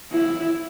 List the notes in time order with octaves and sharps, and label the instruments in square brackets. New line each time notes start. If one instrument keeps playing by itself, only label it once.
[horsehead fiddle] E4